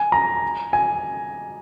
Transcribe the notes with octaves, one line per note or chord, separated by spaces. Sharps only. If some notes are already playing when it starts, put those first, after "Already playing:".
Already playing: G#5
A#5
G#5